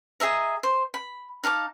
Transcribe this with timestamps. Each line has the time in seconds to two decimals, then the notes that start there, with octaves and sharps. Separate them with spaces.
0.20 G#4 D#5 E5 A#5
0.63 C5
0.94 B5
1.44 D#4 F5 A5 D6